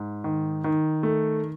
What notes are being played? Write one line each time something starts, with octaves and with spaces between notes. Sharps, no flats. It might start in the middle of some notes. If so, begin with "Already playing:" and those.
Already playing: G#2
D#3
D#3
A3